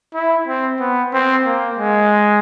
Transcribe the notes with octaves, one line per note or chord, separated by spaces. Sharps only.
E4
C4
B3
C4
A#3
G#3